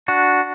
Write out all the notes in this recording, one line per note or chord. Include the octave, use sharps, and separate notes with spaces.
D4 F#4